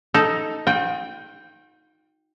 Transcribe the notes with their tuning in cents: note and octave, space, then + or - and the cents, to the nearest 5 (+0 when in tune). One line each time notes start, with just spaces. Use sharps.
D#4 +10 A4 +0
F#4 -45 G5 +0